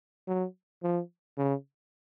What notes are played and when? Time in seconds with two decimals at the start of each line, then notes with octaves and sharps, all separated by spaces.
0.28 F#3
0.83 F3
1.38 C#3